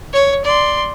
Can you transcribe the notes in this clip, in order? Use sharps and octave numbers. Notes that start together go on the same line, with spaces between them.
C#5
D5 C6